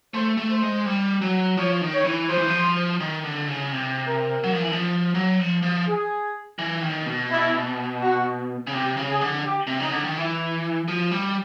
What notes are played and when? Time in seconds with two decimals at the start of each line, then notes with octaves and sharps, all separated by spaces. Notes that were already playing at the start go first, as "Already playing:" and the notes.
0.14 A3 C5
0.37 A3
0.50 C5
0.62 G#3
0.86 G3
1.22 F#3
1.57 F3 C#5
1.81 D#3
1.93 C#5
2.05 E3
2.29 F3 C5
2.38 E3
2.47 F3
3.00 D#3
3.24 D3
3.47 C#3
3.72 C3
4.07 A#4
4.44 F#3
4.52 F3
4.62 E3
4.72 F3
5.15 F#3
5.39 F3
5.63 F3
5.86 G#4
6.59 E3
6.82 D#3
7.06 B2
7.29 E4
8.01 F#4
8.67 C#3
8.73 C3 G4
8.97 C#3
9.09 G#4
9.21 D3
9.45 G4
9.67 C3
9.80 C#3 D#4
9.92 D3
10.04 D#3
10.16 E3 E4
10.88 F3
11.11 G3